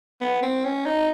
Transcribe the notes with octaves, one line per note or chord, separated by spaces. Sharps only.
B3
C4
C#4
D#4